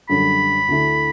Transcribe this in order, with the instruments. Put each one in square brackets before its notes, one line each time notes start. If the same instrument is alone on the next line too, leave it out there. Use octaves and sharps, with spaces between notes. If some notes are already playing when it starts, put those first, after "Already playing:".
[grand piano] F#2 D3 G3 [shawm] B5
[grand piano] D2 D3 A3 E4